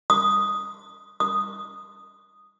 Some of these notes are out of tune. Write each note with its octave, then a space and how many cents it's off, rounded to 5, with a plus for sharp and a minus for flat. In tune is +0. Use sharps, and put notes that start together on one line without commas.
D#6 +0
D#6 -5